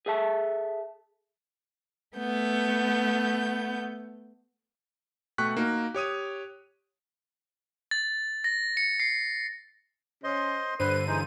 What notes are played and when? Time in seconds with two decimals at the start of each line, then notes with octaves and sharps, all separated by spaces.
0.06 G#4 A4 E5 A5
2.16 A3 B3 G6
5.38 B2 A3 G5 C#6 F#6 B6
5.57 A#3 D#4 F#4 A#4
5.94 G4 C#5 D#6 D#7
7.91 A6
8.44 A#6
8.77 C#7
9.00 C7
10.24 C#4 C5 D#5 C6
10.80 G2 D3 B4 C5 D#7
11.07 E3 G#3 D#4 C5